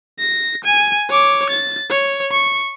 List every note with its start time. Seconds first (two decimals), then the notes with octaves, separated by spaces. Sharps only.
0.19 A#6
0.65 G#5
1.10 C#5 D6
1.50 A6
1.90 C#5
2.32 C#6